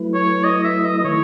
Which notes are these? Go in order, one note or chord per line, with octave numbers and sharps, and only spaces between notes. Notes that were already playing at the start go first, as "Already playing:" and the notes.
Already playing: F#3 A3 E4 B4
C#5
D#5
E5
D#5
D#5
D#3 A3 E4 C#5